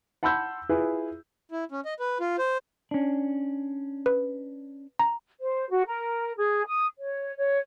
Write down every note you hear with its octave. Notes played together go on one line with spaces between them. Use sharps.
F#5 A5 B5 C6 E6 G6
E4 F4 G#4 B4
E4
C#4
D#5
B4
F4
C5
C#4 D4
B4
A#5
C5
F#4
A#4
G#4
D#6
C#5
C#5